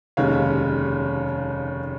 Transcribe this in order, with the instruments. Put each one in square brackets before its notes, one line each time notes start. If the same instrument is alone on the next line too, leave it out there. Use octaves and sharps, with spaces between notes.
[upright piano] F1 D#2 C#3 G#3 C#5 F5